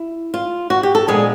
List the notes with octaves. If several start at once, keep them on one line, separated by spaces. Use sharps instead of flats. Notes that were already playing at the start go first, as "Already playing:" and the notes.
Already playing: E4
F4
F#4
G4
A4
A#2 F3 G#3 B3 D4 G#4